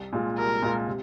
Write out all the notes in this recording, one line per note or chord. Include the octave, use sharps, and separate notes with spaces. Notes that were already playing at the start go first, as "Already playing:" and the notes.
Already playing: C2
A#2 G#3 F4
C2 A#4
A#2 G#3 F4
C3